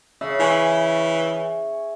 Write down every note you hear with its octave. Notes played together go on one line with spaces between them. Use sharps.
C#3 E5
E3 G#5 C#6